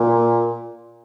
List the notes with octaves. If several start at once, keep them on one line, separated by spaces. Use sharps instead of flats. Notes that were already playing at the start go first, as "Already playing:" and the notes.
Already playing: A#2